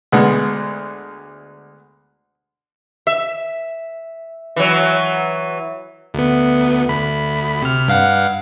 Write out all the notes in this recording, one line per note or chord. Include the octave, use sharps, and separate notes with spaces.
D2 G#3 B3
E5
E3 F#3
D2 B3
D2 B5
C3 F6
G2 F5 F#5